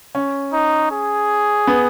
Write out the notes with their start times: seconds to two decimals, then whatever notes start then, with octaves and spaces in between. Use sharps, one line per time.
0.15 C#4
0.53 D#4
0.91 G#4
1.67 B3